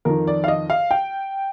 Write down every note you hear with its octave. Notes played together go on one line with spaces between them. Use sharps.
F2 D#3 A#4
D5
F5
D#5
F5
G5